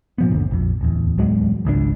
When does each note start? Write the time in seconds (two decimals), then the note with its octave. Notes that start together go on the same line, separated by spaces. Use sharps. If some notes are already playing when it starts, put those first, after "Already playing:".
0.18 A#2 F3 B3
0.31 G1 D#2 D3
0.51 A#1 F2
0.81 D1 E2
1.18 D1 E2 F#3 G#3
1.65 G#1 C#2 B2 D4